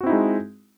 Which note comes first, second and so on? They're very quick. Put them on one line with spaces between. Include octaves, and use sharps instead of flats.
F#4 C4 E4 D#4 G#3